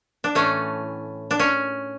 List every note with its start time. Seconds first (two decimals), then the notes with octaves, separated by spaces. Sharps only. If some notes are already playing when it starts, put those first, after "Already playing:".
0.24 D4
0.35 A2 E3 A3 C#4
1.31 D4
1.39 C#4